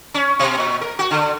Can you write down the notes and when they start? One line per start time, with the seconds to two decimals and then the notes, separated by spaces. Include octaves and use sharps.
0.14 C#4
0.39 B2
0.58 A#2
0.81 A#4
0.99 F#4
1.11 D3